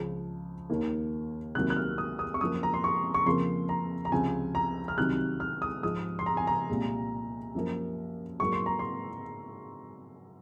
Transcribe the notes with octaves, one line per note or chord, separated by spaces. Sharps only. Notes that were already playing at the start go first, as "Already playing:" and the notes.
Already playing: C#2 C#3 F3
D#2 D#3 A#3
C2 C3 D#3 F#3 A#3 F#6
F#6
F6
D#6
D#6
C#6
F#2 F3 A#3 D#6
A#5
C6
C#6
C#6
F2 C#3 F3 A#3 C6
A#5
A#5
C#2 C3 F3 G#3 G#5
A#5
F6
C2 C3 D#3 F#3 F#6
F6
D#6
G#2 F3 G#3 D#6
C6
A#5
G#5
A#5
C2 A#2 G#3
F#2 F3 A#3
G#2 F#3 A#3 C#6
C6
A#5
C6